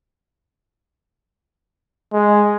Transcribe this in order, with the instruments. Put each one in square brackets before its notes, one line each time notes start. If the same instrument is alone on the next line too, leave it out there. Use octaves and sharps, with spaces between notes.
[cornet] G#3